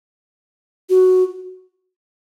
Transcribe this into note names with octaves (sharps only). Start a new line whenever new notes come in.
F#4